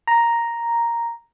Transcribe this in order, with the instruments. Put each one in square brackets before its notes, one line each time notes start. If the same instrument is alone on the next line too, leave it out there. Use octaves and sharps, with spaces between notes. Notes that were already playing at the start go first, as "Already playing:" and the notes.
[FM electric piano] A#5